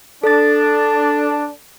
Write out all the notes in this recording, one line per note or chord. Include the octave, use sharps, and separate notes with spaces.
D4 A4 A6